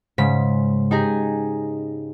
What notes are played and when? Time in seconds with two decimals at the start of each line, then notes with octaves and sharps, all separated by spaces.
0.18 G#2 C#3 B6
0.91 D#4 G4 G#4 G#5 A#5